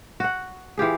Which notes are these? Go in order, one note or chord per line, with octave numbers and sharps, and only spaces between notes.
F#4 F#5
E3 F4 G4 G#4